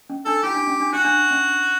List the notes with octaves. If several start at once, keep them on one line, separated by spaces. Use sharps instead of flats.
C#4
D4 A4
E4 G4
D4
C#4
D4
D4 F#4
D4
C#4